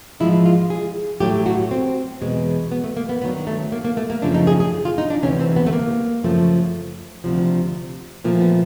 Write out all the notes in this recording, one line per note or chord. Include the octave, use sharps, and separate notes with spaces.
G#2 F3 G#3 E4
F4
G#4
A2 F#3 A3 G4
F#4
C4
E2 B2 G#3
B3
A3
A#3
B3
G2 D#3 F#3 B3
A3
A#3
A#3
A3
A#3
F#2 C#3 F3 A3 D4
D#4
G#4
G#4
F4
D#4
D4
D2 C3 E3 C#4
C4
B3
A3
A#3
F#2 C#3 F3 A3
D2 C3 F3
A#2 F3 A3 A#3
B3